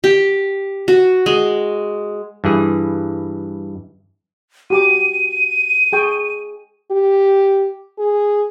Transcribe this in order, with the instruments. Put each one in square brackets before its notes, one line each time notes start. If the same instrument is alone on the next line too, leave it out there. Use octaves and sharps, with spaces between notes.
[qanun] G4
F#4
G#3
[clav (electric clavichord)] G2 E3 G#4
[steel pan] F#4 G4 D6 [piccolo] D#7
[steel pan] G#4 G5 C#6
[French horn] G4
G#4